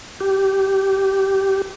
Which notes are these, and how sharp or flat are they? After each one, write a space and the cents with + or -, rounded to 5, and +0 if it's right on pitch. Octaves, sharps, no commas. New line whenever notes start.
G4 -15